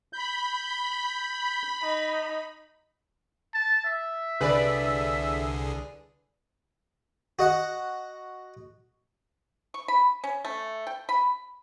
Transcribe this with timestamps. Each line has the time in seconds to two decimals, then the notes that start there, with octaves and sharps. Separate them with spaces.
0.13 B5 G6
1.83 D#4
3.54 A5
3.84 E5
4.41 C2 D3 G#4 B4 D5
7.39 F#4 D#5 F#5
9.74 C#6
9.88 B5
10.24 C#4
10.45 A3
10.87 G5
11.09 B5